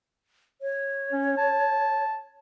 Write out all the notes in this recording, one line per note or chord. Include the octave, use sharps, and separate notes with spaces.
C#5
C#4
A5